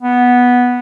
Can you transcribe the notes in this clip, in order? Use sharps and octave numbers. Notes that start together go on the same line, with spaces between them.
B3